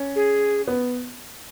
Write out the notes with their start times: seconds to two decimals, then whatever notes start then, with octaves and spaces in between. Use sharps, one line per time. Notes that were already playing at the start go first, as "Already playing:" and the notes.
Already playing: C#4
0.16 G#4
0.67 B3